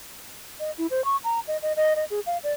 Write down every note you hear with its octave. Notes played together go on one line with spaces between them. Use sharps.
D#5
E4
C5
C#6
A#5
D#5
D#5
D#5
D#5
G#4
F5
D5